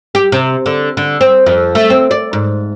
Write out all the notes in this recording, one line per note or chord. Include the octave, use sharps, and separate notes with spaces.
G4
C3
D3
D3
C4
F2
A3
C4
D5
G#2